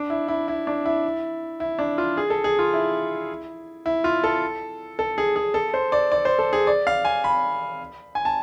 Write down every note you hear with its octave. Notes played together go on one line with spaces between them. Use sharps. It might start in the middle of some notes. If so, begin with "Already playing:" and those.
Already playing: D4
E4
E4
E4
D4
E4
E4
D4
F4
G#4
A4
G#4
F4
E4
E4
F4
A4
A4
G#4
G#4
A4
C5
D5
D5
C5
A4
G#4
D5
F5
G#5
B5
G#5
A5